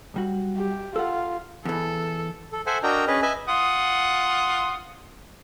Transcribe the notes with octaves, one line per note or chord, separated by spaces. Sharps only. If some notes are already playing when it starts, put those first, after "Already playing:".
B1 G3 F#4
G4
F4 A4 F#5
E2 E3 A4
A4
A4 C5 E5 F#5 G#5
D4 F#4 A#4 D#5 G5 A#5
C#4 G#4 B4 D#5
B4 D#5 E5 G#5
F4 F#5 D#6